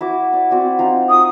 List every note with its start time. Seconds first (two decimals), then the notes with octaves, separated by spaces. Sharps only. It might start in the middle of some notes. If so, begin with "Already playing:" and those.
0.01 E4 F#4 D6
0.33 D5
0.51 C4 F#4 D5
0.79 C4 D#4 F4
1.09 C#6 D#6